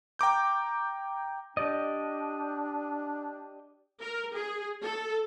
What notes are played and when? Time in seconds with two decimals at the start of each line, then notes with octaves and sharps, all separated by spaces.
0.19 G5 A#5 D6 G6
1.57 D4 G4 D5 D#5
4.00 A#4
4.34 G#4
4.83 A4